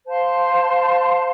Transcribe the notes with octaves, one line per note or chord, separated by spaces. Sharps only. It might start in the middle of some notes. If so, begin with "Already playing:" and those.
C5 F5 A5 C6